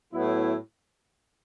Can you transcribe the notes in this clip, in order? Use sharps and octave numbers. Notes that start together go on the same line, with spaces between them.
A2 F#3 B3 E4